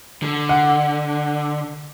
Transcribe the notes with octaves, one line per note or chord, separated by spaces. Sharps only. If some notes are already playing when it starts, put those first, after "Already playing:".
D3
F#5